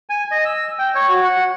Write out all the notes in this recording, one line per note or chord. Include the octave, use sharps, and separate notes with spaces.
G#5
D#5
E6
G5
C#5
F#4
F#5